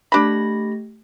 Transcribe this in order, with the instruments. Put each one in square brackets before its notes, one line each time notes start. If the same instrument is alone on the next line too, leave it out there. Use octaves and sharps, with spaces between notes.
[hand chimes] A3 G4 A#6 [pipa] D4 B5